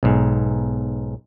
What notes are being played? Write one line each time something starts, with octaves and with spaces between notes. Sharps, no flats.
B1 G#2